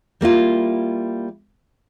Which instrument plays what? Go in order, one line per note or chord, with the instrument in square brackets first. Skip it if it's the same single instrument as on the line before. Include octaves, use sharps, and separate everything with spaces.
[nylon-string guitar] G3 A#3 E4 F4